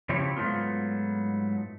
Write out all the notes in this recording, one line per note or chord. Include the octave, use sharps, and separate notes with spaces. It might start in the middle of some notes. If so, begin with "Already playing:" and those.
C#3 F3 C4 E4 G4 C#5
G#2 F#3 A3 B3 F4